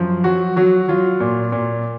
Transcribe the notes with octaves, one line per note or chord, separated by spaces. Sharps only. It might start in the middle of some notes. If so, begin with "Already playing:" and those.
Already playing: F#2 F3
F#3 F#4
F#3 F#4
F#3 F4
A#2
A#2